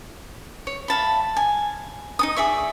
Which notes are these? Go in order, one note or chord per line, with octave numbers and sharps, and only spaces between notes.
C#5
E5 F5 A5 B5
G#5
D#4 A4 D#6
G#4 D5 E5 C#6